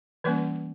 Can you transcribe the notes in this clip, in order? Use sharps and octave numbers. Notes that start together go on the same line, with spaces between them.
E3 G3 A#3 C#4 B4